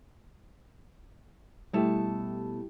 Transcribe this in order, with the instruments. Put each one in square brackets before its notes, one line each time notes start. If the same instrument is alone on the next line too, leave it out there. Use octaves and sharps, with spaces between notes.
[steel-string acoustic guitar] B2 A3 A5 [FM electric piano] G3 E4 G4